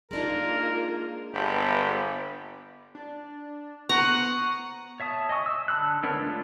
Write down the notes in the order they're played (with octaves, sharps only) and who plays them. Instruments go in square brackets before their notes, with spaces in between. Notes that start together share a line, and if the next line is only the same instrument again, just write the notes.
[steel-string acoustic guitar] G#3 D4 D#4 [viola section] A#3 F4 [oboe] A#4
[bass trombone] G1 [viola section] B3 B5 [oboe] G4
[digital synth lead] D4
[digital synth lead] B3 [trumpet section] C5 F#5 [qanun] A#5 [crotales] C#6
[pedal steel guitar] C#5 E5 A5 D#6
D#5 G#5 C#6 D#6
E6
D3 A5 B5 E6 F#6
G#3 B3 D4 A#4 C#5
A3 D4 F4 A4